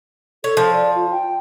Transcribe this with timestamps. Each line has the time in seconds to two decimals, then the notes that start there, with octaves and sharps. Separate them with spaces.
0.44 A4 C#5
0.57 F3
0.73 D5
0.95 F4
1.11 G5